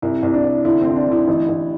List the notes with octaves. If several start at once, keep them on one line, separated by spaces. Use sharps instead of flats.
C2 E4
C2
D4
C2
D3 E4
C4
D3 E4
D4
D3 E4
A1
A1